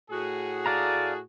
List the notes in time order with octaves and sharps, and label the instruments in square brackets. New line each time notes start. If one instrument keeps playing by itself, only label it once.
[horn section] A2 F#4 G#4
[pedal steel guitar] D5 F5 A#5 [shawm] A5